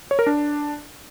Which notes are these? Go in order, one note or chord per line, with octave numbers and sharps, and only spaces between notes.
C#5
A#4
D4